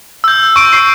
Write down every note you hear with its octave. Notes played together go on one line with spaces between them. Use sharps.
E6 G6
C#6 D7
C7